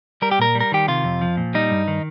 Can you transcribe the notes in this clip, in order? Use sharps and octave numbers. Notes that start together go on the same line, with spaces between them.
G3 A#4
G4
A#2 A#4
G3
A#4
D#3 G4
C3 F4
F2
F3
A#2
G3 D#4
G2
D#3